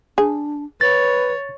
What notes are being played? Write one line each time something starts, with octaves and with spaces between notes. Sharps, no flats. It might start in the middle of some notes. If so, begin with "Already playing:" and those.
D4 G#4
B4 C#5 A6